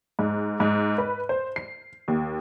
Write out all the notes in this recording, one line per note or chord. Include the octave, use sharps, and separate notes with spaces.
G#2
G#2
B4
C5
C7
D#2